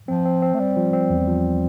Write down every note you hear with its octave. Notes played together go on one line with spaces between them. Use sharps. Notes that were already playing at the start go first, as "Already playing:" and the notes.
F3 C4
C4
C4
A3
G3 C4
F3
C4
E2
F3